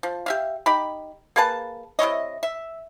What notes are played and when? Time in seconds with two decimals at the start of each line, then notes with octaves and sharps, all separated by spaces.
0.03 F3
0.26 G4 E5 F5
0.66 D#4 G4 B5
1.36 A#3 G#4 B4 A5
1.99 C3 E4 C#5 D#5
2.43 E5